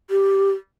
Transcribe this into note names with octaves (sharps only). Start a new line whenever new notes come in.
G4